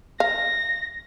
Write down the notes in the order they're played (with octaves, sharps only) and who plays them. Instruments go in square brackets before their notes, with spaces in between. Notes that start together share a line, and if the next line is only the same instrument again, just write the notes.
[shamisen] F5 [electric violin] A#6